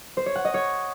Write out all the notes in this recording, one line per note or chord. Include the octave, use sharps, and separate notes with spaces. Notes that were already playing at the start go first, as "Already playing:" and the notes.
C5
C#5
F#5
D#5
C#5